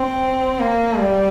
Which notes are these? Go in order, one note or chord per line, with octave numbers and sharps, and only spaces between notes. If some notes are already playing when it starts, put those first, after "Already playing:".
Already playing: C4
A#3
G3